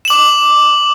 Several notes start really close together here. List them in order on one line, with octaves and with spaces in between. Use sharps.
E7 F#7 D6